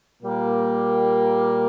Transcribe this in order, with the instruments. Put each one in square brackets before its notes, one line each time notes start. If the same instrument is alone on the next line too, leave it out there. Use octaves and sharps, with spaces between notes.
[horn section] A#2 G3 A#3